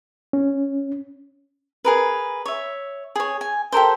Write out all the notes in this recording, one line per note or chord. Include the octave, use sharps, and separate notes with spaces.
C#4
G#4 A#4 B4
C#5 E5
G#4 C#5
G#5
G4 A4 A#4 C5